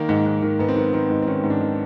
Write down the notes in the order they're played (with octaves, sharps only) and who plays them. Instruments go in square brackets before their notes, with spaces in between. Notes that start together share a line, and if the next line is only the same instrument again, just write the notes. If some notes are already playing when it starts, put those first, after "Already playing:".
Already playing: [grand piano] D#3 A#3
G#2
G#2
D#3
G#2 B3
C4
D#3 B3
D#3 C4
G#2
C4
D#3 C#4
G#2
D4
D#3